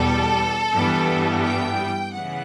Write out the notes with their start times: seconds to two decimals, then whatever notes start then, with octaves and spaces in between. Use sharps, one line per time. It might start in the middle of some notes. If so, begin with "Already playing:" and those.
Already playing: E2 B2 G3 B3 A4
0.74 G2 E3 G3 B3
1.44 G5
2.13 C#3 E3 B3 F#5